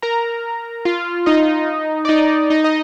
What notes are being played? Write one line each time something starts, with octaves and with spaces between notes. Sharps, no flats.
A#4 A#5
F4 F5
D#4 D#5
D5
D#4 D#5
D#4 D#5
D#5